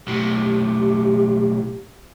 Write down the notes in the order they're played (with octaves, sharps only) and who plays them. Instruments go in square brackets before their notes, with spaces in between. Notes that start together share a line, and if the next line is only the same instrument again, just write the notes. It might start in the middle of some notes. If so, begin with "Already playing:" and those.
[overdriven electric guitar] B1 A2 [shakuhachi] G4